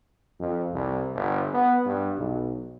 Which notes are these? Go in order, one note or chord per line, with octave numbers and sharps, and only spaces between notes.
F2
C2
G1
B3
G2
B1